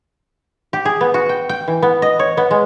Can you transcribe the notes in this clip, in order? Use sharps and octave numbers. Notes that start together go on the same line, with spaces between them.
G4
G#4
B3
F#4
G5
G5
E3
B3
D#5
C#5
B3
G#3